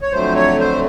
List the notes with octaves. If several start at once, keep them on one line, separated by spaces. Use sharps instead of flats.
C#5
F2 D3 F#3 A3 C5
C#5
C5